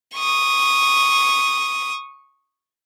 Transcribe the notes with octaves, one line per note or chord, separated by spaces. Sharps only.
C#6 D#6